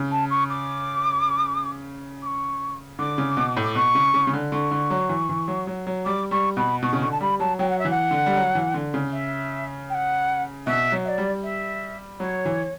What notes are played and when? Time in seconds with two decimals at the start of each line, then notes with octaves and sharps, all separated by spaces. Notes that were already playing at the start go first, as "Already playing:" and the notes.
Already playing: C#3
0.11 A5
0.30 C#6
0.50 D6
2.22 D6
2.26 C#6
2.99 D3 D6
3.18 C#3
3.37 B2
3.57 A2
3.64 D6
3.75 B2 C#6
3.95 C#3
4.14 C#3
4.27 C#3
4.33 D3
4.52 D3 C#6
4.71 D3
4.90 F#3
5.09 E3
5.29 E3
5.48 F#3
5.67 F#3
5.87 F#3
6.05 G3 D6
6.31 G3 C#6
6.57 B2 B5
6.83 B2 C#6
6.93 C#3
7.01 D3 C#6
7.11 A5
7.21 G3 B5
7.40 F#3 A5
7.59 F#3 G5
7.70 F#5
7.79 E5
7.85 E3
7.90 F#5
8.11 D3
8.26 G3
8.36 F#3
8.55 E3
8.74 D3
8.94 C#3
9.12 E5
9.90 G5
9.94 F#5
10.66 B2 E5
10.92 F#3
11.05 E5
11.08 D5
11.18 G3
11.43 E5
12.20 F#3 C#5
12.45 E3